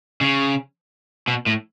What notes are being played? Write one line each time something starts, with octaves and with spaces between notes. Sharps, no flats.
C#3
B2
A2